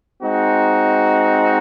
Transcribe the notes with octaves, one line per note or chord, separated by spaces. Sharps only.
G#3 C4 D#4 F#4